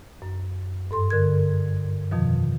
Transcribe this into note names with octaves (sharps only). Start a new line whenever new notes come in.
F#2
G2 A4 C6
D3 A#4 G#6
F2 B2 D#3 F3